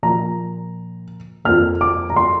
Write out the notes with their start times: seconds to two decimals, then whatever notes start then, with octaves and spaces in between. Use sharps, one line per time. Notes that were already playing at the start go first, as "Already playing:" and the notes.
0.03 A#2 F3 A#3 A#5
1.45 F2 F3 A#3 F6
1.81 D6
2.10 A#5
2.16 C6